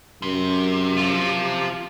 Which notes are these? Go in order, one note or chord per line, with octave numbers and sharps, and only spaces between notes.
F#2 C3
F3 F4